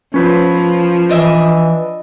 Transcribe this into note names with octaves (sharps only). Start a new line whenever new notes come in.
F3 C#4 B4 C5
E3 D4 D#5 E5